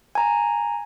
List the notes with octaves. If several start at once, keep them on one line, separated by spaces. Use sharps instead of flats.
G#5 A#5